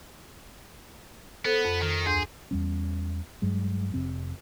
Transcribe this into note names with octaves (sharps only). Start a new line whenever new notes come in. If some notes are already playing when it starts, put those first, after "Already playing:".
B3 A4 C5
F2
D#3
D2 G#4 C6 G6
E2 G3 C#4
G2 F#3 G#3
F1 C3 C4